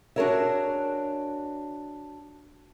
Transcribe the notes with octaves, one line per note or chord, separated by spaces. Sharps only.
D4 F#4 G#4 A#4 C#5 E5